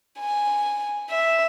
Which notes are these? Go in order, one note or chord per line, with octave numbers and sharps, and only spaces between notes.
G#5
E5